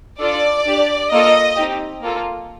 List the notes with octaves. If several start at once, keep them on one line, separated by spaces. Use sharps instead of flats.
D4 F4 A4 D5
D4 G4
A#3 F4 A4 D#5
C4 D#4 G4
A#3 F4 A4